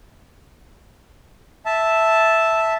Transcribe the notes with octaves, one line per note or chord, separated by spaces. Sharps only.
E5 A5